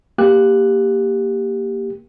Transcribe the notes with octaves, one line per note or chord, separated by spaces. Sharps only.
A#3 G4 F#6